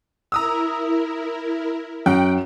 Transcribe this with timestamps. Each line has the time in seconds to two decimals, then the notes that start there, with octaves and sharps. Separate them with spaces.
0.32 E4 A#4 A#5 D#6 E6
2.06 F#2 F#5 G5